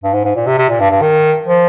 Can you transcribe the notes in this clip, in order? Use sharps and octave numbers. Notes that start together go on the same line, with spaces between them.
G2
G#2
G#2
A#2
C3
C3
A#2
G2
G2
D#3
F3